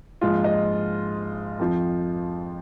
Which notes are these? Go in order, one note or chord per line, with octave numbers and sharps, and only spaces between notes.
A#1 G#2 F3 F4
D#5
F2 F3